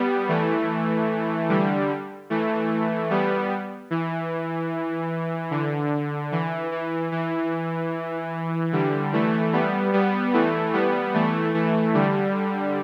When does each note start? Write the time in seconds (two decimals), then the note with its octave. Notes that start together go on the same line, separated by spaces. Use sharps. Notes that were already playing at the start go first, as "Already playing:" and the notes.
Already playing: G3 B3
0.29 E3 A3
1.49 D3 G3
2.30 E3 A3
3.10 G3 B3
3.90 E3
5.51 D3
6.32 E3
6.72 E3
7.12 E3
8.72 D3 G3
9.13 E3 A3
9.53 G3 B3
9.93 G3 B3
10.33 E3 A3
10.73 G3 B3
11.14 E3 A3
11.54 E3 A3
11.94 D3 G3